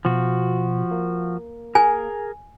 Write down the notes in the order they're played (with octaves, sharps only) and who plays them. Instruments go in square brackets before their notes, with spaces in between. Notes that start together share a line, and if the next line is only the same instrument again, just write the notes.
[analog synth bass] B2 [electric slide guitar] F3 F#4
[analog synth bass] A#3
[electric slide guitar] G#4 A#4 [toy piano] G#5